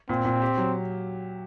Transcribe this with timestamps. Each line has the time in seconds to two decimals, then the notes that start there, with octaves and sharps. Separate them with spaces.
0.09 A#2 C4
0.25 A#2
0.42 G4
0.58 F#3